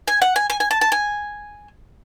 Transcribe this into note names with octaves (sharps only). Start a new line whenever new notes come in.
G#5
F#5
G#5
G#5
G#5
A5
A5
G#5